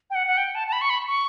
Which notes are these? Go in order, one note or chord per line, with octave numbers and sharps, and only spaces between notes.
G5
F#5
F#5
G5
A5
A5
B5
C#6
B5
C#6